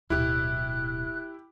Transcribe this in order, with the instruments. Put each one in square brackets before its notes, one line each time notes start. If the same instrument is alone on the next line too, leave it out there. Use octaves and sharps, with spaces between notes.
[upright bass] D1 B2 [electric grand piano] E4 G4 [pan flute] F#6